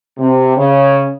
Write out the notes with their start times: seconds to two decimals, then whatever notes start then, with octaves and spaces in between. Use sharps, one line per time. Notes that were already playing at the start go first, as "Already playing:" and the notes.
0.18 C3
0.56 C#3